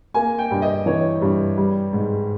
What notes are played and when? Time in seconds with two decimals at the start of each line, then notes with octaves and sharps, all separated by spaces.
0.14 A#3 G#5
0.39 G5
0.51 G2
0.62 D#5
0.86 E3 C#5
1.22 G2
1.57 G3
1.93 G#2